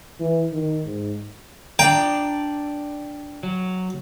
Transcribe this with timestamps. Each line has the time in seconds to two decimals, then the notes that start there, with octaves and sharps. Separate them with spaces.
0.20 E3
0.53 D#3
0.85 G#2
1.79 D4 D5 G5 A#5
3.43 F#3